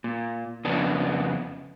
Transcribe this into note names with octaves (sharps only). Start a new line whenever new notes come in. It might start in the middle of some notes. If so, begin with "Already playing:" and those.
A#2
F2 C#3 B3 D4